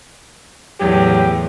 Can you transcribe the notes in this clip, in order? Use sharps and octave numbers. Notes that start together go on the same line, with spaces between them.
E2 A2 F#3 G4